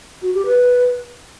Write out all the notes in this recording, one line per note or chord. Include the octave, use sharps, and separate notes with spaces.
F#4
G4
B4